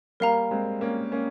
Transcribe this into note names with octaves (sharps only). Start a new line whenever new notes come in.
G3 A#3 A#4 F5 A#5
G#3 C4
A#3 C#4
A#3 C#4